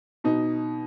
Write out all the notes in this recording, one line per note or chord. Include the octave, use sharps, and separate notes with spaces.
B2 D#4